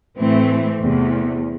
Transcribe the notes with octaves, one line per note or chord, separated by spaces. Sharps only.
A2 E3 A3 C4
E2 C3 A3